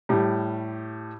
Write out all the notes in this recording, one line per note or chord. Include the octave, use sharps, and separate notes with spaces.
A2 G3